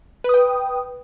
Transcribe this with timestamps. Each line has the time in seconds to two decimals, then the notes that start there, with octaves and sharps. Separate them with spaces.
0.24 B4
0.29 D#6
0.34 G5